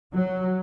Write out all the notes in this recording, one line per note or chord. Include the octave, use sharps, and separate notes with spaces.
F#3